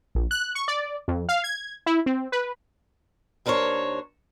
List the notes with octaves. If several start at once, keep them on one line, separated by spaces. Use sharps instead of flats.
A#1
F#6
C#6
D5
F2
F5
G#6
E4
C4
B4
D#2 D4 A#4 C5 C#5